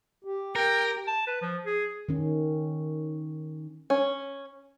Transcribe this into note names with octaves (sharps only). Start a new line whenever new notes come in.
G4
A#4 G5
A5
B4
F3
G#4
D#3 C#4
C#4